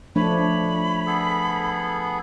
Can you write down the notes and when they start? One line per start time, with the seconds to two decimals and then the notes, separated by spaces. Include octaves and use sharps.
0.16 F3 A3 D4 C#5 B5
1.06 B3 G#4 A4